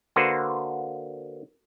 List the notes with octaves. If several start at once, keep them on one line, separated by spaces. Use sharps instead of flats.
D3 A#3 F#4 B4 C5